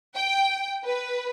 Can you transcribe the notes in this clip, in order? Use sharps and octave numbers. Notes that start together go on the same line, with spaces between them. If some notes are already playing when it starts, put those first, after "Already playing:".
G5
B4